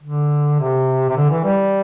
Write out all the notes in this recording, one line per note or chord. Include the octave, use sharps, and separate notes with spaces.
D3
C3
C3
D3
E3
G3